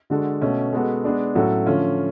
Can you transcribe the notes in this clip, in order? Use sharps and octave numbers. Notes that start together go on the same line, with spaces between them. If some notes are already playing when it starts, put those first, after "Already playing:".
D3 G#3 D4 F#4 A4
B2 A3 C#4
G#3 B3 F#4 A4
G#3 B3 D4
A2 F#3 C#4 F#4 A4
D3 F3 A3 C#4 F4